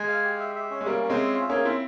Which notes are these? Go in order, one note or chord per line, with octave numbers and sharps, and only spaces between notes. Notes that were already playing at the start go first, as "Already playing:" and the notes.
Already playing: G#3 G#5
F5
G4
E5
E5
C#4
G#3
G3 A#3 C#4
C#4
G#3 C4
E5
F4
A#3 C#4 G#4
C4 E4 F4